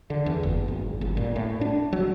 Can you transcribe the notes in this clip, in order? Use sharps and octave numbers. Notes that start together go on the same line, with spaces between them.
D3
E2
F#1
G#1
G1
A#2
A2
D4
F#3